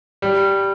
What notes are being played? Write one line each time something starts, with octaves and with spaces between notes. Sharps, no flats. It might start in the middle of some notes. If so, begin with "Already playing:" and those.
G3